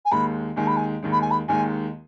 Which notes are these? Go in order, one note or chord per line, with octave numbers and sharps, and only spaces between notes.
G#5
D#2 D#3 G#3 B5
D#2 D#3 G#3 G#5
B5
G#5
D#2 D#3 G#3
B5
G#5
B5
D#2 D#3 G#3 G#5